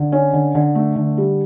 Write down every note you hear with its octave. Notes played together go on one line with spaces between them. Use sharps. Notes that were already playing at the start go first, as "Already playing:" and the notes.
Already playing: D3
C#4
D3
D3
A3
D3
G3